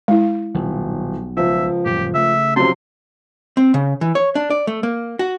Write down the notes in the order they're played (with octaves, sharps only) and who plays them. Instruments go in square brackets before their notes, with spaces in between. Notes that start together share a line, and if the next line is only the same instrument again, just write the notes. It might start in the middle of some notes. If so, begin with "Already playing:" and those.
[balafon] G#3 E4
[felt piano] D#1 [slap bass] B1
[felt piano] C#2 F3 [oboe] E5
[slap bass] D#1 F#2 [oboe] G4
[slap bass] C#3 A3 [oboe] E5
[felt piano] C3 F3 F#3 [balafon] C#4 [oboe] C6
[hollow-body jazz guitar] C4
C#3
E3
C#5
D4
D5
A3
A#3
F#4